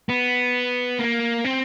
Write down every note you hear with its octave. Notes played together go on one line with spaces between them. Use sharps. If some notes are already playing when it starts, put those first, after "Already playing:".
B3
A#3
C4